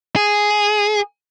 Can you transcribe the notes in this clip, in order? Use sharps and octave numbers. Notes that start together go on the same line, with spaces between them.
G#4